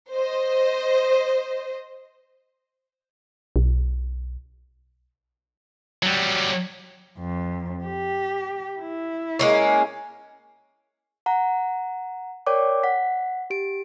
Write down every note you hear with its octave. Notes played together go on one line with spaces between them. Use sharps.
C5 D#5
B1
F#3 G3
F2
G4
E4
G#3 A#3 C#4
F#5 A#5
A#4 C#5 D5 G5 D6
F#5 B6
G4 D7